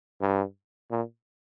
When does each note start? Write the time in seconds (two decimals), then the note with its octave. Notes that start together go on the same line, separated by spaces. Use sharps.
0.21 G2
0.91 A#2